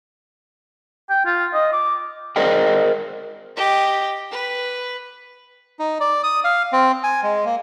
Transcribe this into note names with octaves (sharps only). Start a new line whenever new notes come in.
G5
F4
D#5
D6
G#4 A#4 C5 D5 D#5 G5
G4 D#5
B4
D#4
D5
D#6
F5
C4
G#5
G#3
A#3